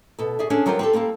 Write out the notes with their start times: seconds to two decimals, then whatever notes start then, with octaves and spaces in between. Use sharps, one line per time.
0.18 B2 A4
0.39 G#4 D5 E5
0.50 C#4 D4 G#4 A4 C#5
0.66 F#3 G3 F4 A#4 C5
0.79 C4 G4 A4
0.93 G3 A#3 C4 A4